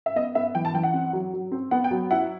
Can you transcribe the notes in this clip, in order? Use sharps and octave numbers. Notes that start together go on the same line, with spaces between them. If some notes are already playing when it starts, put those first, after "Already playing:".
E5
B3 D#5
B3 E5
E3 G5
A5
E3 G5
F#5
C4
F#3
F#3
C4
B3 F#5
G5
F#3
E4 F#5